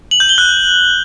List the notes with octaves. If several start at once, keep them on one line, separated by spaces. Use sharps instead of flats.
F#7
G6
G7
F#6